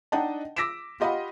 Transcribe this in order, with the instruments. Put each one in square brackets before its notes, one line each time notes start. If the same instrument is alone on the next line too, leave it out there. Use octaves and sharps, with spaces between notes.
[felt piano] D4 D#4 D#5 F#5 G5 A5
D6 E6 A#6 B6 D7 E7
F4 G4 D#5 F5 F#5 B5